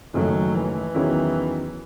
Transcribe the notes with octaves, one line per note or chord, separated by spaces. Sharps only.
F#1 F#2 D#3 F#3 A3
E3
E2 D#3 F#3 C#4 E4